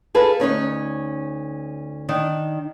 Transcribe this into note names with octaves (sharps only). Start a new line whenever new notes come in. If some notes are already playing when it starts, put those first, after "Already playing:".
F4 G#4 A4 B4
D2 C#4 D#4 C#5
D#3 D4